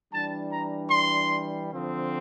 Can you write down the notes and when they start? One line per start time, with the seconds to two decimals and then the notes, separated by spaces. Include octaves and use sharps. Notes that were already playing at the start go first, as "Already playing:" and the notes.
0.12 E3 G3 D4 A5
0.52 A#5
0.91 C6
1.70 D3 F3 C4